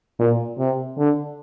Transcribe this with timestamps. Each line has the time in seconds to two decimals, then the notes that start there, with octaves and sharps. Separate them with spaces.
0.19 A#2
0.59 C3
0.98 D3